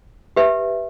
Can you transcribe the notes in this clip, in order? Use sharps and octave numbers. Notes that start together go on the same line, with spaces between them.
G4 B4 E5